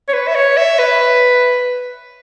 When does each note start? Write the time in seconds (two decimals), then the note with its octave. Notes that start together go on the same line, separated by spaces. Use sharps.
0.09 C#5
0.13 B4
0.28 E5
0.35 C#5
0.57 E5
0.79 B4